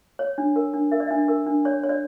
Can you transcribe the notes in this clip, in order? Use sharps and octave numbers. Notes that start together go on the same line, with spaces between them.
C#5
D4
A#4
D4
A#4 E5
D5
D4 E5
A#4
D4
C#5 D5
C#5
D5